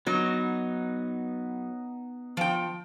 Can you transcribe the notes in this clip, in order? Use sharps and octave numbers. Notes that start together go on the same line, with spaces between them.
F#3 B3 D#4
F3 G5